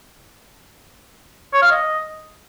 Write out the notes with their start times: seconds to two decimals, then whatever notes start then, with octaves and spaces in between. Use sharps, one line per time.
1.53 C#5
1.62 F5
1.71 D#5